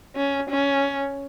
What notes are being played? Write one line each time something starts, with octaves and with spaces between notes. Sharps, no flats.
C#4
C#4